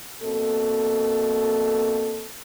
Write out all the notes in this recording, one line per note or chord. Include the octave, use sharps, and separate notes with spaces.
B2 A#3 C4 A4